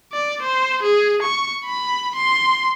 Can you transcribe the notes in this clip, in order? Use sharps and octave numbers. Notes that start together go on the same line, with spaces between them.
D5
C5
G#4
C#6
B5
C6